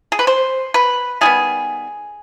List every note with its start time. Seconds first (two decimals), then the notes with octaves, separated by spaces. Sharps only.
0.12 G#4
0.19 B4
0.27 C5
0.74 B4
1.21 D#3 G3 B3 G#4